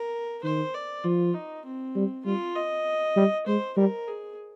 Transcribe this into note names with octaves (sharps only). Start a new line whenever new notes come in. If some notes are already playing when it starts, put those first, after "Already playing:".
Already playing: A#4
D#3 C5
D5
F3 F4
D#4
C4
G3
G3 F4
D#5
G3
G#3 C5
G3 A#4
G#4